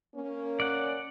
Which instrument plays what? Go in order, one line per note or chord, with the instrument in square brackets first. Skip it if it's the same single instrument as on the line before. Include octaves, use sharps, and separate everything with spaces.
[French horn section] A#3 C#4
[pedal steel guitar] D5 F#5